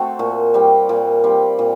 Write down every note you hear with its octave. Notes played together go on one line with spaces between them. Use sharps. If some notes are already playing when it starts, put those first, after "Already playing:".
Already playing: A3 C4 F#4
A#2
G3 C4
A#2
G3 C4
A#2